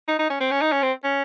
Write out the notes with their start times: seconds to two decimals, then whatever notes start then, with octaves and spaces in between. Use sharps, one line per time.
0.08 D#4
0.19 D#4
0.30 C#4
0.40 C4
0.51 C#4
0.62 D#4
0.72 C#4
0.83 C4
1.04 C#4